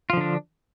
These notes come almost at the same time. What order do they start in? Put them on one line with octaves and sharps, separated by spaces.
F4 F3 D3 D4